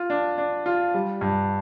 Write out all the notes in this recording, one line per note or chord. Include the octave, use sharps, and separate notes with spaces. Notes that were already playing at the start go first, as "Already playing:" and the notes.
Already playing: F4
D4
D4
F4
G3
G2